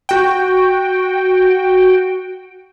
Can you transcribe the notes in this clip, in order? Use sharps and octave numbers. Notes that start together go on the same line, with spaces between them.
F#4 G5